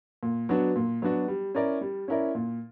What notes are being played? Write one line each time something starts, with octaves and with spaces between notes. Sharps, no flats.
A#2
F#3 B3 D4 F#4
A#2
F#3 B3 D4 F#4
G3
C#4 E4 A#4 D5
G3
C#4 E4 A#4 D5
A#2